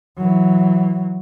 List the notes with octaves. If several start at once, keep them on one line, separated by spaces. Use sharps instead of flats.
E3 F#3